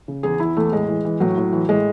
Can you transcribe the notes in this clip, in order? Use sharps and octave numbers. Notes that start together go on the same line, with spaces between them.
C#3
E2 G#4
E3 E4
E2 A3
A2 G#3
E3
E3
A2 F#3
A2
E3
A2 G#3